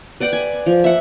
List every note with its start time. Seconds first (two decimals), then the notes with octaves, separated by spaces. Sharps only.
0.20 B4 D5 F#5 G5
0.33 G#5
0.66 F3
0.84 E5 F#5